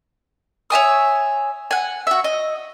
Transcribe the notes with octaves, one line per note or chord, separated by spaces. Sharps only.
C#5 E5 G#5 D#6
F#5 G#5
F#4 E5
D#5